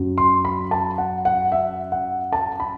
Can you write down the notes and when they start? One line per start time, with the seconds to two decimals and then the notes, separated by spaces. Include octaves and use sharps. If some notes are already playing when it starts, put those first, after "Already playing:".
Already playing: F#2 F#3
0.18 C6
0.45 B5
0.71 A5
0.98 F#5
1.25 F#5
1.52 E5
1.92 F#5
2.33 A5
2.60 B5